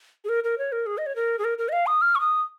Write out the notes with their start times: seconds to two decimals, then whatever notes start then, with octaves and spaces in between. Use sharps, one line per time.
0.25 G#4
0.29 A#4
0.44 A#4
0.58 C#5
0.72 A#4
0.86 G#4
0.98 D#5
1.06 C#5
1.16 A#4
1.39 G#4
1.44 A#4
1.58 A#4
1.69 D#5
1.72 F5
1.87 D#6
2.01 F6
2.15 C#6
2.20 D#6